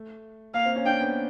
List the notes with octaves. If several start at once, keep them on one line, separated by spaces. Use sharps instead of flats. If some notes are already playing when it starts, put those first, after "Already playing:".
Already playing: A3
A#3 F5
C4
C#4
D4 G5
B3